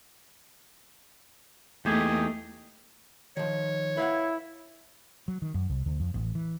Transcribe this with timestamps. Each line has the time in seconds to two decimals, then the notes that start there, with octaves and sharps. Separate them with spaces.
1.85 E2 A3 A#3 D#4 G4 G#4
3.37 D#3 F3 C#5
3.97 E4 B4 F5 F#5
5.28 F#3
5.42 D#3
5.54 F#2
5.69 C2
5.86 D2
6.00 F2
6.14 A1
6.35 E3